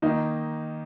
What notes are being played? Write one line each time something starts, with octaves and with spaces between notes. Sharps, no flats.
D#3 A#3 D#4